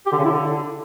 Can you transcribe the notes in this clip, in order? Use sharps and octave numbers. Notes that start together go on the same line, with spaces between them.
G4
D3
C#3
E4
D3